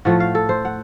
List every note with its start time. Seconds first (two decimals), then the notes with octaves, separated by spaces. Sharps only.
0.05 A2 F3 A3 F#5
0.20 F5
0.35 A4
0.49 C5
0.65 F#5